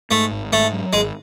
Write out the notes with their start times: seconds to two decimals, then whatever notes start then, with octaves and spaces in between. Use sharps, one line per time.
0.11 G#2 A3
0.32 G#1
0.52 G#2 A3
0.72 F#3
0.93 G#1 G#3